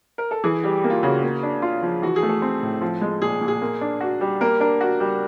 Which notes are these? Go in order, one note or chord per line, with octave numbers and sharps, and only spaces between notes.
A#4
A4
E3 G#4
G3 G4
A#3
F4
C#3 F#4
A#3
D4
F4
F3
E3 F#4
G#4
A3
A4
C4
A2
F3
G#3
A#2 G#4
A#2
G#4
A#3
D4
F#4
G3
A#3 A#4
D4 A#4
F#4
G3